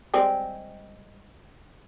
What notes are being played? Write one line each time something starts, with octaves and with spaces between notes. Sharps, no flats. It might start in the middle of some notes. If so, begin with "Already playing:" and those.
G3 G#3 C4